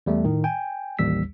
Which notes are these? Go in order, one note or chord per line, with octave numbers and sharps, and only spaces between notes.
E2 G3 A3
A2 D#3
G5 G#5
A1 D#2 G3 E6 B6